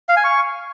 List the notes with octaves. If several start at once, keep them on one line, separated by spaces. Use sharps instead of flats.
F5
G#5
C#6